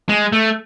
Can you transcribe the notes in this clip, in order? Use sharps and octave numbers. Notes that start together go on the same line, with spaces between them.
G#3
A3